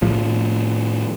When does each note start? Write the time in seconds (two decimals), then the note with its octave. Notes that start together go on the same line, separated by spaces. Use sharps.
0.02 A2 F3